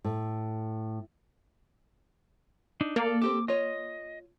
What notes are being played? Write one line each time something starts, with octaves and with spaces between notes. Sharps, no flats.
A2
D4 D#4
A#3 A4 D5 F5
C4 G4 A4 D6
F4 C#5 D#5